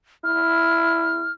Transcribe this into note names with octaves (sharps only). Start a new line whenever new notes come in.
E4 F6